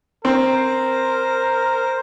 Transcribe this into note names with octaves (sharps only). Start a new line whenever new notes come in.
C4 A#4 C5